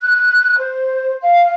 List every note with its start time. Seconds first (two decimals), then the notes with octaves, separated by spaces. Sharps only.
0.02 F#6
0.58 C5
1.22 F5